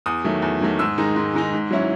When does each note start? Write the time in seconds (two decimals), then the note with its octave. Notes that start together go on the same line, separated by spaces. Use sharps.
0.06 E2 D#6
0.24 D#3 F#3 A3
0.42 E2
0.61 D#3 F#3 A3
0.79 G#2 E6
0.98 D#3 G#3 D#4
1.16 G#2
1.34 D#3 G#3 D#4
1.53 G#2
1.71 F#3 C#4 E4